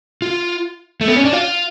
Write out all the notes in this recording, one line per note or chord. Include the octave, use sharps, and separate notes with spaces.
F4
A3
B3
C#4
D4
F4